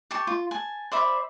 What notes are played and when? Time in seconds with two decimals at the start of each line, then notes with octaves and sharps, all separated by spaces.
0.11 G4 G5 A5 C#6
0.27 F4
0.51 G#5 A5
0.92 C5 D5 E5 B5